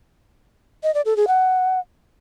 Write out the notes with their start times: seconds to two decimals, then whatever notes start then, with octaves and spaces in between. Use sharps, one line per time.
0.83 D#5
0.94 D5
1.05 A4
1.16 G#4
1.28 F#5